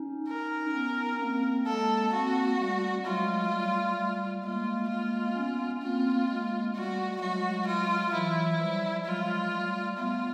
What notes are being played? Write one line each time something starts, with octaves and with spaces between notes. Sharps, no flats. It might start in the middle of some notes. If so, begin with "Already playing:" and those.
Already playing: C#4 D#4
A#4
B3 C#4
A#3 C4
G#3 A#3 A4
A#3 C4 F#4
G3 A3
F#3 G#3 F4
G3 A3
G3 A3
G#3 A#3 F4
G#3 A#3 F4
B3 C#4
A#3 C4 F4
G#3 A#3
G3 A3 F#4
F#3 G#3 F#4
F4
E3 F#3 E4
F3 G3
F#3 G#3 F4
G3 A3
A3 B3 F4